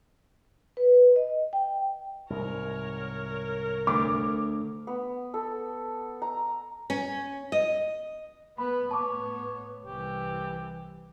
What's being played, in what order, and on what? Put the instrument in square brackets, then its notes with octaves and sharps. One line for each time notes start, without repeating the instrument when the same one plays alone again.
[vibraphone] B4
D#5
G5
[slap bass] C2 G#2 [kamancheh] A#4 C#5
[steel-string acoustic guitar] D2 [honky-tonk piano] D6
[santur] B3
A4
A#5
[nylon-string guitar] C#4
D#5
[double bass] B3 [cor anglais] B4 [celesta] B5
[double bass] A2 B3 [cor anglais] C#5 [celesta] A5 D6
[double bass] C2 E3 [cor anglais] G4